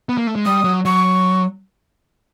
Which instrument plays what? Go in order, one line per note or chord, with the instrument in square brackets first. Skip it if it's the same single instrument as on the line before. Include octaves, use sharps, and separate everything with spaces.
[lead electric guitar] B3
A#3
A3
G#3
[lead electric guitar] G3 [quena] D#6
[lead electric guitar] F#3
[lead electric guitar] F#3 [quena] C#6